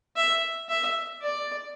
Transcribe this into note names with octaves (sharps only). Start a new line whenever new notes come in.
E5
E5
D5